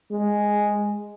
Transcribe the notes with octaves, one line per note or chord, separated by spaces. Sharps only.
G#3